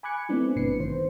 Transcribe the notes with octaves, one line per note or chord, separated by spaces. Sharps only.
G#5 B5 D6 F#6 G#6 C#7
A3 B3 C4 D4 E4
G#1 G2 B2 B4 C7 C#7
A1 D#3 C5